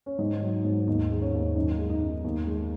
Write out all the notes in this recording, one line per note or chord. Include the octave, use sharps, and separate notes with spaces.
C#4
G#2 D#4
F#3
G#2
D#2 D#4
G#3
C#4
D#2
F#2 D#4
G#3
D#4
F#2
D#2
G#3